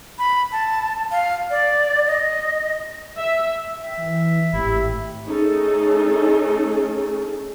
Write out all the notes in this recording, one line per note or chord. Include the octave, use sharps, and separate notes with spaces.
B5
A5
F5
D5
D#5
E5
E5 G5
E3
G#1 A2 E4 G4
A3 C#4 D#4 G#4 A4